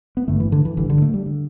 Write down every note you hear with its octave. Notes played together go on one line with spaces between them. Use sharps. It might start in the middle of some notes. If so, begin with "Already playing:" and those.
B3
A1 G2 D3 A3
E3
D3
E3
A1 G2 D3 E3
D3
A3
G3
D3